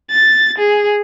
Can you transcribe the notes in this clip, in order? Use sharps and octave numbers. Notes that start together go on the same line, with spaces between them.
A6
G#4